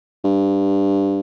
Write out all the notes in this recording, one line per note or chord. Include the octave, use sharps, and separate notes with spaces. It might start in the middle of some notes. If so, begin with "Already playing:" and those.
G2